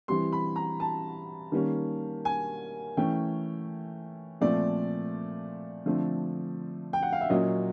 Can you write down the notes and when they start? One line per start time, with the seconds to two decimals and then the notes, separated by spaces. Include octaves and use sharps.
0.08 E3 G3 C4 C6
0.32 B5
0.56 A#5
0.80 A5
1.52 D#3 G3 A#3 C#4
2.25 G#5
2.97 E3 A3 C#4 G5
4.41 A#2 F3 A3 C4 D5
5.86 D3 F3 A3 C4
6.93 G5
7.02 F#5
7.12 F5
7.21 E5
7.30 A#2 F#3 A#3 C#4 D#5